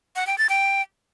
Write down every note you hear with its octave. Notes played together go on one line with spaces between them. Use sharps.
F#5
G5
A6
G5